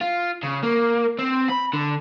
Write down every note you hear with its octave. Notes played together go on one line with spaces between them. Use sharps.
F4
C#3
A#3
C4
B5
D3